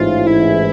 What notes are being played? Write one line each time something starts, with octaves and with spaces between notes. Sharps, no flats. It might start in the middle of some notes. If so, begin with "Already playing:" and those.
Already playing: A1 G#2 E3 F4
E4